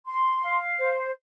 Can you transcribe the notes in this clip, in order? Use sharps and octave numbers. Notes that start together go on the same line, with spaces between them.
C6
F5
C5